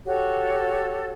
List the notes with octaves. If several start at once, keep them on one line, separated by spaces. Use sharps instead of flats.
F#4 G4 A4 C#5